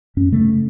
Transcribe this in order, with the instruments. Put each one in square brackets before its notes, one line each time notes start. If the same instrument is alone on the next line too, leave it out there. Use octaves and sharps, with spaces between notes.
[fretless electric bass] F#2 C#4
C#3 A3